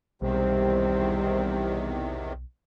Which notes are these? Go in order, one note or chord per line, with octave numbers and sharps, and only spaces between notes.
B1 E2 C3 D#3 G3 C4 C5